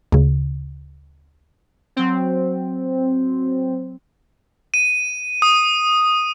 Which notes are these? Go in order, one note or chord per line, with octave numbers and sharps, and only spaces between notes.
D2 C#3
F#3 C4
D#7
D#6